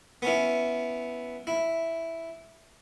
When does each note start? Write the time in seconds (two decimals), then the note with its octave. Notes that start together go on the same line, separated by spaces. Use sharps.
0.22 B3 C#4 E4
1.47 E4